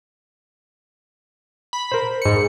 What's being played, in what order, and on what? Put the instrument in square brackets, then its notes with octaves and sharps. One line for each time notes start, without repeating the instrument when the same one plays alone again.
[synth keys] B5
[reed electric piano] A#4 C5
[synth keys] G#2 C#7